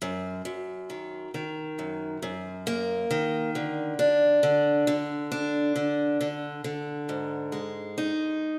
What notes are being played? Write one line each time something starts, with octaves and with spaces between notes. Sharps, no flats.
F#2
F#2
D#3
D#3
F#2
F#2
A#3
D#3
D3
D4
D3
D3
D4
D3
D3
D3
G#2
G#3
D#4